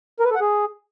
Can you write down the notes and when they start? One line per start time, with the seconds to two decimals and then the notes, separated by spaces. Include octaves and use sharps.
0.20 A#4
0.25 B4
0.30 A4
0.35 F#5
0.41 G#4